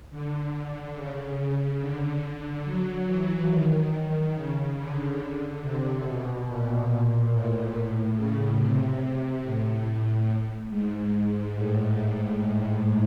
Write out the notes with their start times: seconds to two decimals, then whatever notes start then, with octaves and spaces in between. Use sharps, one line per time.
0.11 D3
0.95 C#3
1.38 C#3
1.80 D3
2.65 F#3
3.07 E3
3.50 D#3
4.34 C#3
4.77 D3
5.61 C3
6.04 B2
6.46 A#2
7.31 A2
8.15 C#3
8.58 C3
9.43 A2
10.69 G#2
11.55 A2